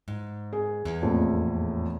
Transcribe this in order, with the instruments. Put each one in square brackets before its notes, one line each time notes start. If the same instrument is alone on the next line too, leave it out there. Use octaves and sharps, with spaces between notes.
[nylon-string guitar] G#2
[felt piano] G#4
[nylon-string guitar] E2
[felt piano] A#1 F2 A2